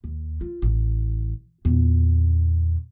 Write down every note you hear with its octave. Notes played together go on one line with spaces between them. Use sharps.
D#2
F4
A1
E2 A#2